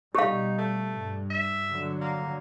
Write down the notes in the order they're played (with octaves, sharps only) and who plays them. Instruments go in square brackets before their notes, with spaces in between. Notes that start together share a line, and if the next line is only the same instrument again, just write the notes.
[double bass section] B2 G3 [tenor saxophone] D#4 [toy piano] G4 F5
[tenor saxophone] A3
[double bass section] G2
[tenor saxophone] E5
[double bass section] D3 F#3
[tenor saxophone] A#3